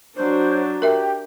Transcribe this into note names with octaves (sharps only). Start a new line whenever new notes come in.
F#3 D4 C5
G4 A#4 E5